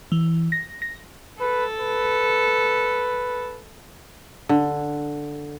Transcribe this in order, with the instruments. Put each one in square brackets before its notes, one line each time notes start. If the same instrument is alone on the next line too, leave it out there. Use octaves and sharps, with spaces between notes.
[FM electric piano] E3
A#6
A#6
[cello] A4 [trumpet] B4
[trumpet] B4
[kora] D3